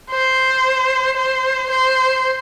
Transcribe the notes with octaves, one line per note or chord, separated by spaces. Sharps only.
C5
C5
C5